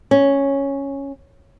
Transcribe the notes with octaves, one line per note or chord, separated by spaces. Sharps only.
C#4